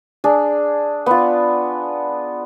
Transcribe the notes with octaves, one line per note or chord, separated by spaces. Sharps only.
D4 G#4
B3 F4